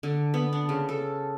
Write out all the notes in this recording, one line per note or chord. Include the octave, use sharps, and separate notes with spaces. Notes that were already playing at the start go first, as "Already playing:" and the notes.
D3
B3
D4
C#3
A4